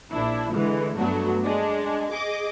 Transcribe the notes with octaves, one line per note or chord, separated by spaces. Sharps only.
A#1 D4 E4
D3 E3 G#3
G2 F#3 A3 B3 D4 F#4
G#3 D4
G#4 D#5 D6